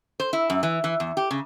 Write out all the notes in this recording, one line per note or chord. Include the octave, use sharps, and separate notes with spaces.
C5
E4
F#2
E3
E3
E2
G4
C#3